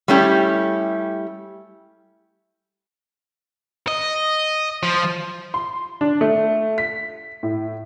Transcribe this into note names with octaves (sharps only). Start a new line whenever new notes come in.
G3 A3 C#4 E4 G4
D#5
F3
C6
D4
A3
B6
A2